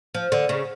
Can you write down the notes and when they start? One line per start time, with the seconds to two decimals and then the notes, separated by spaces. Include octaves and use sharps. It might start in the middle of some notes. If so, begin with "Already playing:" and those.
0.14 F3
0.32 D3
0.49 C#3